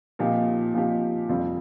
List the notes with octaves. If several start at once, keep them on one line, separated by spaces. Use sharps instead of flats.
A#2 F3 C4 D#4 G4
A#2 F3 C4 D#4 G4
F2 C3 G3 C4 F4